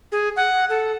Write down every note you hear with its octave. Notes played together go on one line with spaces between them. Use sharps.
G#4
F#5
A4